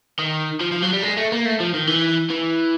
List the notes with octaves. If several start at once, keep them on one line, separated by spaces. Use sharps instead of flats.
D#3
F3
F3
F#3
G3
G#3
A3
A#3
A3
F3
D#3
E3
E3